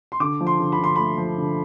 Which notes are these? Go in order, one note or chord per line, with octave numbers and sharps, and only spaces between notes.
C6
D3 D6
F3
C6
D3
B5
D3 C6
A3 B5
F3
D3